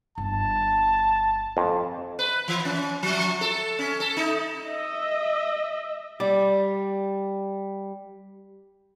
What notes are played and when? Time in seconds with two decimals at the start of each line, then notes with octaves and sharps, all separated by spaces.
0.18 G1 A5
1.57 F2
2.19 B4
2.48 E3
2.65 C#4
3.03 F3
3.41 A4
3.79 C#4
4.00 A4
4.17 D#4
4.62 D#5 E5
6.20 G3 D5